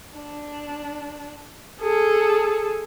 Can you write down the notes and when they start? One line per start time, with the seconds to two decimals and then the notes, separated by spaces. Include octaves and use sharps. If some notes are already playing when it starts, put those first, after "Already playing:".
0.17 D4
1.80 G#4 A4